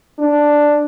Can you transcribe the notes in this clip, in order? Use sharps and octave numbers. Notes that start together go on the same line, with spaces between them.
D4